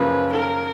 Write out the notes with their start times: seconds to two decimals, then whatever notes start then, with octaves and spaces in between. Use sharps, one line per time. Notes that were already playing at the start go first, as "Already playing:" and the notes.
Already playing: F#2 C#3 F3 A#3 C#4 B4
0.33 A#4